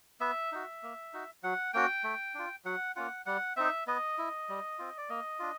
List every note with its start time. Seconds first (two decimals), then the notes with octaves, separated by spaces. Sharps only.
0.21 B3 E5
0.52 D#4 F#4
0.83 A#3
1.13 D#4 F#4
1.43 F#3 F#5
1.73 A#3 C#4 F#4 G5
2.04 A3
2.35 D4 F4
2.65 F#3 F#5
2.96 A#3 C#4 F4 F#5
3.26 G3 F#5
3.56 C4 D#4 E5
3.87 B3 D#5
4.18 E4
4.49 G3
4.79 C4 F4
4.98 D5
5.10 A#3 D#5
5.39 D4 F4